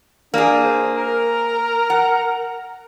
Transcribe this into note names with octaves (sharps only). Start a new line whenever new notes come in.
A#3 D4 G#4
C5
A#4
F#5